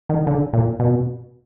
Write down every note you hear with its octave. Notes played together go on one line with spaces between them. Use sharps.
D#3
D3
A#2
B2